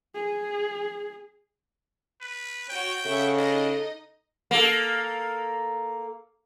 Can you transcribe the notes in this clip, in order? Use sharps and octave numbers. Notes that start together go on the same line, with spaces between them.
G#4
B4
F#4 C#5 G5
C#3 A4 C#5 E5 F#5
D4 D#4 D#5
A#3 A4